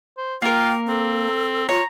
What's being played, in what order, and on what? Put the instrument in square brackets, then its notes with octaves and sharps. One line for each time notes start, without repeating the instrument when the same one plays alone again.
[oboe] C5
[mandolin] A#3 A#4 [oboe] F4 [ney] G5
[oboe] C4 [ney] A4
[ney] F4 [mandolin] C#5 [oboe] A#5